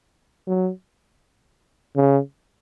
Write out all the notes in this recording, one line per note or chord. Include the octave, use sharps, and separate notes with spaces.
F#3
C#3